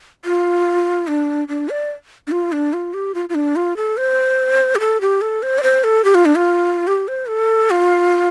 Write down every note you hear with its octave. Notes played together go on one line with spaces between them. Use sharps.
F4
D4
D4
D5
D4
F4
D4
F4
G4
F4
F4
D4
F4
A4
C5
G4
A4
G4
A4
C5
D5
C5
A4
G4
F4
D4
F4
G4
C5
A4
F4